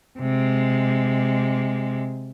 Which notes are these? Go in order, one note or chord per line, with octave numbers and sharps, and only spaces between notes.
C3 G#3